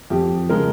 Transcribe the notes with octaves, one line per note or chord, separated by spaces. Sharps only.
F2 G4
C#3 G#3 A#4